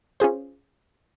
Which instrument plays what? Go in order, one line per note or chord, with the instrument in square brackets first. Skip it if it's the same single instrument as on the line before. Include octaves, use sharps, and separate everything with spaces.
[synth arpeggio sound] C#4 F4 G#4 C5